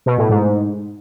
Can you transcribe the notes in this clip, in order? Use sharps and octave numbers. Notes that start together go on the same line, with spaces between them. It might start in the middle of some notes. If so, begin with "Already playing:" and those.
B2
A2
G#2